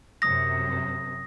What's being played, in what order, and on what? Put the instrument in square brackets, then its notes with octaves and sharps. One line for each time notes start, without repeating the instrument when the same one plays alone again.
[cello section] F#2 C3 [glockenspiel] D#6 A#6